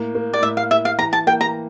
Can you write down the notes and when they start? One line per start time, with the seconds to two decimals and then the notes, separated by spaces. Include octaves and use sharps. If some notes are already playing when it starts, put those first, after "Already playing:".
Already playing: A2 A#3
0.15 A#3
0.33 D5
0.42 A2 E5
0.57 F5
0.70 E4 E5
0.85 F5
0.99 E3 A#5
1.13 A5
1.27 A#3 G5
1.41 A#5